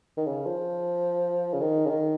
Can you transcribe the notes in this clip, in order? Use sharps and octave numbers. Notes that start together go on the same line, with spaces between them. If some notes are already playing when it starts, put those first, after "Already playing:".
D#3
C#3
F3
C#3
D#3
C#3
D#3